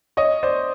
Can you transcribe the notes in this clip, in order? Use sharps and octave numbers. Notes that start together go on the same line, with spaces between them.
C#5 D#5
C5 D5